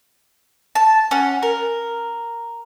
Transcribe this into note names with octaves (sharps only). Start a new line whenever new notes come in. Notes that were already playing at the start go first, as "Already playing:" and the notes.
A5
C#4 F#5
A#4